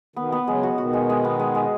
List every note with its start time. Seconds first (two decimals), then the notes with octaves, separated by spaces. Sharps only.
0.16 B2 D#3 B3
0.32 B3
0.47 C#3 F#3 G#3
0.63 F#4
0.78 B2 D#3 F#4
0.93 G#3
1.10 G#3
1.24 B3
1.39 G#3
1.55 G#3